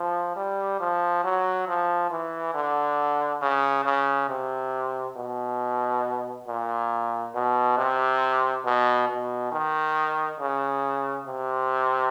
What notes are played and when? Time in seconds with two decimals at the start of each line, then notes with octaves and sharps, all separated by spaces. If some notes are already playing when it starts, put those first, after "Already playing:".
Already playing: F3
0.36 G3
0.80 F3
1.24 F#3
1.68 F3
2.11 E3
2.54 D3
3.42 C#3
3.85 C#3
4.29 C3
5.16 B2
6.47 A#2
7.35 B2
7.78 C3
8.65 B2
9.09 B2
9.52 D#3
10.40 C#3
11.27 C3